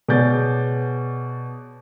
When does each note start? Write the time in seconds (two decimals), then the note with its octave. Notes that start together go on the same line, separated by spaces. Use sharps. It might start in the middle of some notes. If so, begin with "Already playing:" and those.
0.08 B2 G#4 C#5 D5 G6 A6